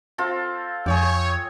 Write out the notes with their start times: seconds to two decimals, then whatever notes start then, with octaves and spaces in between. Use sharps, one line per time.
0.18 C4 F4 A4
0.86 F2 G#4 C#5 G5